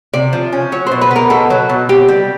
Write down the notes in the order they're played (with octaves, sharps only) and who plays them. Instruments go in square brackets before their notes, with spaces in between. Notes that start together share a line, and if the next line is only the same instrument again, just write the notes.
[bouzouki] C3 [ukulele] D5
[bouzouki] F3
C#4
[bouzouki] F#3 [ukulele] C#5
[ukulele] C5
[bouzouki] B2
[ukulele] B4
[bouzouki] B3
[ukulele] A#4
[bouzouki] B2 [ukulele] A4
[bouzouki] F#3
B2
[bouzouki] C4 [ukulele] G4
[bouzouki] G3